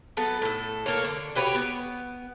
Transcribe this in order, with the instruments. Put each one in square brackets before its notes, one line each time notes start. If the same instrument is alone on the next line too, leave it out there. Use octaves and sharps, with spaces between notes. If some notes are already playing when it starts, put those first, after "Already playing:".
[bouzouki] F#3 B3 A4 B4
A2 A4
A#3 A4 C#5
D3
F#4 G4 B4 C#5
B3